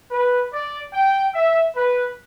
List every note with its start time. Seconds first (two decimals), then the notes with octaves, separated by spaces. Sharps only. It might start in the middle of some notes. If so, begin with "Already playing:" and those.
0.11 B4
0.53 D5
0.93 G5
1.34 E5
1.75 B4